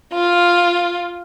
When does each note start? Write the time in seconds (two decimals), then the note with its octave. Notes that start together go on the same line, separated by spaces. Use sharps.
0.13 F4